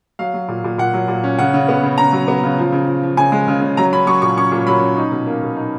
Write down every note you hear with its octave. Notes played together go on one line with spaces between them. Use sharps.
F#3 F5
F#3
A#2
A#2
A#2 F#5
F#3
A#2
C#4
C#3 F#5
C#3
B3
C#3
C#3 A#5
F#3
B3
C#3
F3
C#3
F3
F3
C#3 G#5
G#3
C#3
C#3
F#3 A#5
C#4 B5
F#3 C#6
A#2 C#6
C#4 C#6
A#2
F#3 B5
C#4
D#4
B2
A#3
B2
D#4